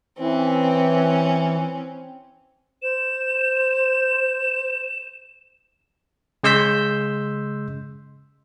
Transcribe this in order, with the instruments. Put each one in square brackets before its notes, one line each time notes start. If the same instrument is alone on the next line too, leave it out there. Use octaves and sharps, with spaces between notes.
[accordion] E3 [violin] C4 C#4
[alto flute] C5 [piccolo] E7
[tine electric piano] C#3 G#3 C6 E6 G6 B6